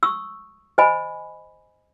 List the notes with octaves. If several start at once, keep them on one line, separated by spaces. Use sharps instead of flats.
C#6 D#6 E6
C5 D#5 G#5 B5